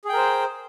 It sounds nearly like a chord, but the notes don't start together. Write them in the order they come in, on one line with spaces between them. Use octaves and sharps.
G#4 G5 A#4 C5